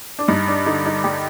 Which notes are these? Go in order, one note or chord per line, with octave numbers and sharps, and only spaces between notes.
D4
G2 D#4
D4
D3 D#4
D#4
G3 G4